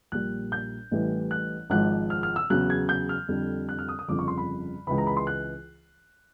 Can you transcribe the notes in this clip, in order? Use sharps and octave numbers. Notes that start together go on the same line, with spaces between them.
A#1 A#2 G3 F#6
G6
A1 A2 E3 G3
F#6
G#1 G#2 F3 F#6
F6
F6
E6
E2 C#3 F#3 F#6
G#6
G6
F6
F2 D3 G3
F#6
F6
D#6
D#6
G1 F2 C#3 F3 D6
C#6
C6
B5
C#2 C#3 E3 B5
A#5
B5
C6
F#6